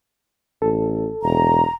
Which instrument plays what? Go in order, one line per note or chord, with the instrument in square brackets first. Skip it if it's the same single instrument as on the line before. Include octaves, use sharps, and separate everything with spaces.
[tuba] A1 [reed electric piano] A4
[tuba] E1 [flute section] A#5